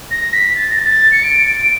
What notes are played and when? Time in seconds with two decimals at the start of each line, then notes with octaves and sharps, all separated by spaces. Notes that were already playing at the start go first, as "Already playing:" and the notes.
0.11 A#6
0.33 B6
0.56 A6
0.71 A#6
0.78 A6
1.12 C#7
1.24 D7